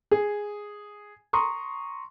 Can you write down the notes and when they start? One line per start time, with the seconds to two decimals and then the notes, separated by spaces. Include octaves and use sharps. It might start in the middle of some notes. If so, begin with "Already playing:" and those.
0.11 G#4
1.33 A#5 C6 C#6 D#6